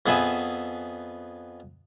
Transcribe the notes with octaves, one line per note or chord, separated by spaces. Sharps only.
F2 B3 G#4 B4 E5 G#5